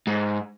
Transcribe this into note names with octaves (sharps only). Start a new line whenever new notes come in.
G#2